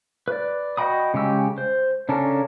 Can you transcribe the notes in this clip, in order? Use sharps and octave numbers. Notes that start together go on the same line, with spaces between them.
B4 D5
F#4 D#5 G5 B5 D#6
C#3 G#3 G4 E6
C5
C#3 C#4 D4 A4 A#4